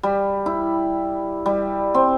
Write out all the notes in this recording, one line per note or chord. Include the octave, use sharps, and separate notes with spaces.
G3
E4
G3
C4